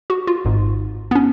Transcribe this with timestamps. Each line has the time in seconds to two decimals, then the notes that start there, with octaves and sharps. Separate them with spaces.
0.10 F#4
0.27 F4
0.45 G#1 G#2
1.11 B3
1.15 C#4